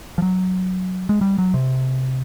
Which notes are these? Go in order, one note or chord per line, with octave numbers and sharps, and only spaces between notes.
F3
F#3
G#3
G3
F#3
C3